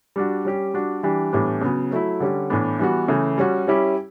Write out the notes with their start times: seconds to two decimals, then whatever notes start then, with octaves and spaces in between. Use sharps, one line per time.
0.16 G3 D4 F#4
0.45 G3 C#4 G4
0.74 G3 D4 F#4
1.03 E3 G3 D4 G4
1.33 A2 E3 G3 B3 D4
1.61 C#3 F#3 B3
1.91 F#3 A3 E4
2.20 D3 G3 C#4 G4
2.50 A2 E3 B3 D4
2.79 E3 G3 B3 F#4
3.08 C#3 E3 A3
3.38 G3 C#4 F#4
3.67 G3 C#4 E4 G4